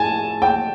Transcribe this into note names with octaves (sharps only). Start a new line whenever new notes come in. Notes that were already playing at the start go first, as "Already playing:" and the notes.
Already playing: A2 G#5 A5
G5